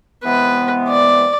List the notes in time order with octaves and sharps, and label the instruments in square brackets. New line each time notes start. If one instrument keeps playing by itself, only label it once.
[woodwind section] C3 E3 G#3 B3 [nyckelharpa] B4
[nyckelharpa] D5